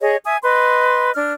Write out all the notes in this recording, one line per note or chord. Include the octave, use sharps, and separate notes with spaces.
G#4 C#5 D#5
E5 G#5 D#6
B4 D#5 C6
D4 F6